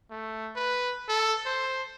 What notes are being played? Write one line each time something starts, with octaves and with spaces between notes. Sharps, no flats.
A3
B4
A4
C5